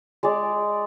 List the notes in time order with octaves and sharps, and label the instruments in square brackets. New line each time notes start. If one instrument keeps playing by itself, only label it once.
[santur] G#3 D5